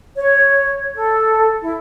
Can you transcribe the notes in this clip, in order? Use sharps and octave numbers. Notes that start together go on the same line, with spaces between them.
C#5
A4
E4